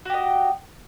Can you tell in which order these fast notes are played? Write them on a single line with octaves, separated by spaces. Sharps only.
F#4 G4 D#5